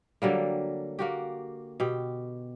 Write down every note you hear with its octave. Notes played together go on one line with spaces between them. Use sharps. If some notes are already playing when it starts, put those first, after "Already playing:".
D3 F#3 G3 A#3
A#3 F#4 G4
B2 G4